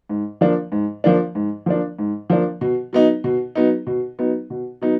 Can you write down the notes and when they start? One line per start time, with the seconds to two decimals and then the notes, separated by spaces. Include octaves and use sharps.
0.09 G#2
0.41 F3 A#3 D4
0.72 G#2
1.04 F3 A#3 D4
1.35 G#2
1.66 F3 A#3 D4
1.99 G#2
2.30 F3 A#3 D4
2.61 B2
2.93 F#3 B3 D#4
3.24 B2
3.55 F#3 B3 D#4
3.87 B2
4.19 F#3 B3 D#4
4.50 B2
4.82 F#3 B3 D#4